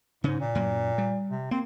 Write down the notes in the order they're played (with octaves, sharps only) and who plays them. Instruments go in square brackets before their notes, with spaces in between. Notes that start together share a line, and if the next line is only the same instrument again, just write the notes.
[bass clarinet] G#2 [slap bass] C#3 C#4
[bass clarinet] A#2
[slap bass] F#2 F#3 A#3
G3
[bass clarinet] C3
[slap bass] A#3 [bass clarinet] C4